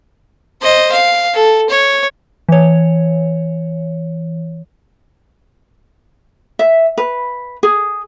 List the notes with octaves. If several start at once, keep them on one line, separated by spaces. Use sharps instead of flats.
C5 D#5
F5
A4
C#5
E3 C#5
E5
B4
G#4